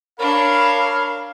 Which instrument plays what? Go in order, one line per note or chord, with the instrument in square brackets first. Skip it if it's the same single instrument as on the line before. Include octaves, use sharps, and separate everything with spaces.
[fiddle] D4 C#5 [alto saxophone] A#4 [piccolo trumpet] F5 [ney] B5